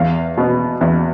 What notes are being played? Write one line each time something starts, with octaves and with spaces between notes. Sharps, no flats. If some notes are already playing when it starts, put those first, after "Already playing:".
Already playing: E2 F5
B2 B3
E2